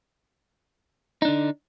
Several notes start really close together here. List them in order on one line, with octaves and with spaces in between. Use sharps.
D#4 D4 D3